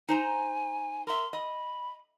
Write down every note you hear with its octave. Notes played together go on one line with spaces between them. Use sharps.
D#4 C5 G#5 A#5
A#4 E5 C6
D#5 B5